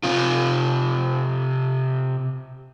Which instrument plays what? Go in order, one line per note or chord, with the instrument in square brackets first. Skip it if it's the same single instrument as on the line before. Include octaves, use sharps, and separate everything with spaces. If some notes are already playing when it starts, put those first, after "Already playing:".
[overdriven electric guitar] C3 F4